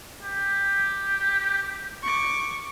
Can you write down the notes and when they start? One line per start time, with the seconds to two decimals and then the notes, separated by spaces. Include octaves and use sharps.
0.23 G4
2.03 C#6 D6